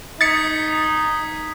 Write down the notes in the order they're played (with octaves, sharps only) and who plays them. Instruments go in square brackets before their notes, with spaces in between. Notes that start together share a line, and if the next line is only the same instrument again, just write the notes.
[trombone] D#4 [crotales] D#6 G#6 B6 [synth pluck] A6 C#7